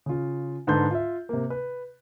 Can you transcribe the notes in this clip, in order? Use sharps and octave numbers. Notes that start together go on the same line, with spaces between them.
C#3 F4
G#2 D3 B4 A5 C6 G6
F4 E5
C3 A#3
B4